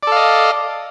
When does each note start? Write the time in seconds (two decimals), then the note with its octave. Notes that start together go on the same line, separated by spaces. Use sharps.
0.03 D5
0.07 A4
0.12 F5
0.16 D#5